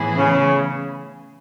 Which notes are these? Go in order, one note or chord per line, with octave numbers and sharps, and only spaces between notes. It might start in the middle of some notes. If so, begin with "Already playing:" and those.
Already playing: A2 E3 B3 E4 G#4
C#3